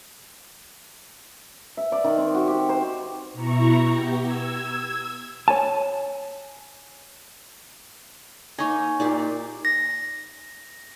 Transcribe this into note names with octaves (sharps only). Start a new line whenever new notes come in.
E5
D5
D#3
C4
F#4
G4
C5
B2 E4 A#5 C#6
B3 G4
E6 G#6
C#5 G#5 A5
A#3 D#4 C#5 D#5 G#5
A#2 D#4 G4 G#4 D5
A#6